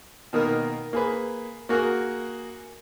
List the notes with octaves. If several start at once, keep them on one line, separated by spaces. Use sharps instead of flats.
B2 D#3 A#3 A#4
A#3 G#4 B4
A#3 F#4 G#4 A#4